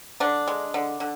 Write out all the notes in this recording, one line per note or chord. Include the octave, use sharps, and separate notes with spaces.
D3 D4
G#3
D3
D3